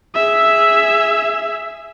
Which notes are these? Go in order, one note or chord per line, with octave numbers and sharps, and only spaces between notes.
G#4 E5